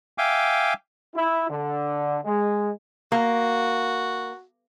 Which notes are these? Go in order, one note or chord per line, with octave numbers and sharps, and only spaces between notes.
E5 F5 G5 G#5 D6
E4
D3
G#3
A#3 F#4